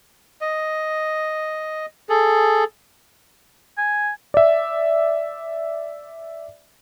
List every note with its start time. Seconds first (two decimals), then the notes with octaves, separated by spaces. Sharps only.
0.41 D#5
2.09 G#4 A4
3.78 G#5
4.34 D5 E5